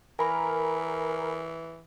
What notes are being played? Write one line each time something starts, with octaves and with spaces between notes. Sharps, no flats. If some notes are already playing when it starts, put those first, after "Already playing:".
E3 A#4 G#5 B5